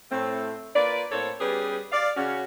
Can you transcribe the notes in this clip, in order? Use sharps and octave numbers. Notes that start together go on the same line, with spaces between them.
A2 A3 C4
A#3 F4 B4 D5
A2 A#3 C4 A4 C#5
G3 B3 C#4 G4 G#4 B4
D5 F5
C#3 C#4 F#4